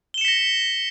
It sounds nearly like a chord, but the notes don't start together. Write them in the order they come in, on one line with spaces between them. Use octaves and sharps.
G7 E7 C#7 B6 A#6